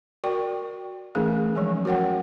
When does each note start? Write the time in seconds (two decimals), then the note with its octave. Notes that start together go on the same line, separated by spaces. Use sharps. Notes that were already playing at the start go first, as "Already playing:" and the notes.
0.24 F#4 A#4 D5 G5 C#6
1.15 E3 A3 C#4 D#4 G#4 A#4
1.55 F3 F#3 G#3 C#4
1.85 F#4 A#4 C#5 F#5 G5